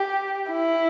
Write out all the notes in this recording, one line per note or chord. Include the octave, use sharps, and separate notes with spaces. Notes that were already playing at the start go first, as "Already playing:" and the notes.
Already playing: G4
E4